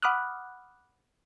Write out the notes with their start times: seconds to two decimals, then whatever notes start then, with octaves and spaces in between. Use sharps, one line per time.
0.02 F#5 B5 D6 D#6 F6 F#6